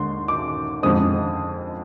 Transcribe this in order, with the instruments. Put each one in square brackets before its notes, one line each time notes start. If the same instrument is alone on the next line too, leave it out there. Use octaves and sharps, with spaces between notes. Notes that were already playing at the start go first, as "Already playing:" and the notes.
Already playing: [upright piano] D#2 D3 G#3 D#4 C6
D6
F2 D3 G#3 C4 D#6